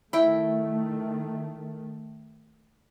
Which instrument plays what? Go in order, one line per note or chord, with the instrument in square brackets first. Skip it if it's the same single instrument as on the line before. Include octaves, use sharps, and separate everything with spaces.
[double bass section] D#3 A3 [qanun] E4 G5